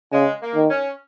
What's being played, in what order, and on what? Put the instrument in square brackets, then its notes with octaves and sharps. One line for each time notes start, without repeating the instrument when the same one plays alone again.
[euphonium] C#3 [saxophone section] G#3
[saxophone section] A#3
[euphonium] D#3
[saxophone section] C#4